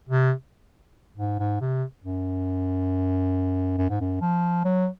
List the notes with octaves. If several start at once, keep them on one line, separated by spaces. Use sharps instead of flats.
C3
G#2
G#2
C3
F#2
F#2
G#2
F#2
F3
F#3